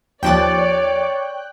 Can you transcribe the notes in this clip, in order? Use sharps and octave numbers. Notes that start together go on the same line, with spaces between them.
D#2 F3 C#5 D5 G5 F#6 A6